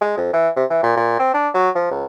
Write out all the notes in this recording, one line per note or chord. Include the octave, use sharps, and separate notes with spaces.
G#3
F2
E3
C3
E3
A#2
A#2
C4
D4
F#3
F3
C#2